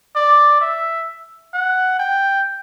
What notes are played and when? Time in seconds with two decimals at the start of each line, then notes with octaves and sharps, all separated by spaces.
0.15 D5
0.61 E5
1.54 F#5
1.99 G5